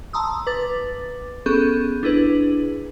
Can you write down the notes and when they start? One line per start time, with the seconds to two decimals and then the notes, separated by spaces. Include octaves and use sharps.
0.13 A5 A#5 C6 D#6 E6
0.47 B4 D6 A6
1.46 B3 C#4 G#4 A4 C#6 G6
2.03 D4 E4 G#4 B4